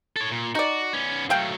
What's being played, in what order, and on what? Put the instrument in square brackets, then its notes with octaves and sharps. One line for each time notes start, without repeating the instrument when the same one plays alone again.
[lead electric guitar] A4 C#5
A#2
[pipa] D#4 D5 [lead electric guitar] F#4
[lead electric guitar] B3 C#4
[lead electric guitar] F#3 A3 [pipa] F5 G5